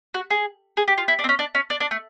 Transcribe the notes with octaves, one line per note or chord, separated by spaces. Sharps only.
F#4
G#4
G#4
G4
F4
E4
D4
C4
C#4
D4
C#4
D4
D4
A3